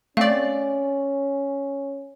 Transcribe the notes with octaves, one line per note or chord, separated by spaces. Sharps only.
A3 C4 C#4 D5 F5